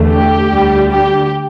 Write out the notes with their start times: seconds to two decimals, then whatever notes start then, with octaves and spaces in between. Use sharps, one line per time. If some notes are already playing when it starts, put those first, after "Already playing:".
Already playing: E2 D3 A3
0.08 G4
0.49 D2 D3 G3
0.90 G4